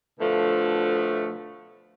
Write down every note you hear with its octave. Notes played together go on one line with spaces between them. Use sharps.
B2 D3 F3 A3